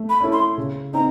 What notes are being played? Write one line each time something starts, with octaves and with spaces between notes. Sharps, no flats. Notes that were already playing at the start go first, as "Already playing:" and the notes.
Already playing: A3
B5
C#4 E4 A4
C6
C#3
C4 D#4 A#5